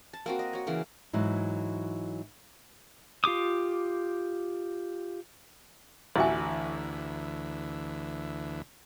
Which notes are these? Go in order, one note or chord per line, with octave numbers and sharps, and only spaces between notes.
A5
A#3 C4 F#4
D#5
F#4 C#5
C#3 E3 A#3
G#2 E3 F#3
F4 G4 D6 D#6
A1 D2 E3 E4 F#4 E5 G#5